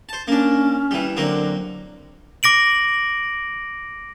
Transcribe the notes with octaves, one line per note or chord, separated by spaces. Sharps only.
C5 A5
A#3 C#4 D4
E3 G3
D3 F#3 A#3 C4
D6 A#6 D7 F#7